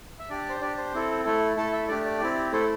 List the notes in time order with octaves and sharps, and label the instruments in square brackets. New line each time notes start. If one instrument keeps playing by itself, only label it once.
[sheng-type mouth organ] E5
D4 G4 D5
C5
D4 G4 D5
C5
C4 E4 A4
A3 E4 A4
A3 E4 A4 A5
E5
A3 D4 G4 D5
D5
C4 E4 G4
A3 E4 A4 C5